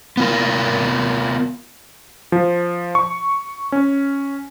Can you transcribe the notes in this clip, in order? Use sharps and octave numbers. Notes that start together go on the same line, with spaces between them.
B3 F4 A#4
F3
C#6
C#4